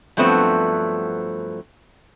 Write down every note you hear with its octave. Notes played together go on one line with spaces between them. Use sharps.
G2 F3 F#3 A3 B3 C4